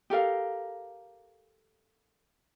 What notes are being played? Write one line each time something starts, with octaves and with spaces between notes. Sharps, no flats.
G4 A4 A#4 F5